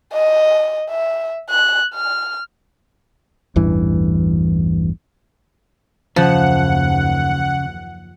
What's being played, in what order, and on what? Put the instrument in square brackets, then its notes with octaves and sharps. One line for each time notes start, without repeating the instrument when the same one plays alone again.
[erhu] D#5
E5
F#6
F6
[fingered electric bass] A1 E2 G2 E3
[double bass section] F#1 D#2 E3 [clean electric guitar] C#3 [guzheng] F3 [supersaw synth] F#5